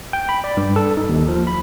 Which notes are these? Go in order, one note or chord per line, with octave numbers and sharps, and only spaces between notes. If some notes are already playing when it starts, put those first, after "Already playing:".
G5
B5
D5
G2
A4
D#4
D#2
F3
B5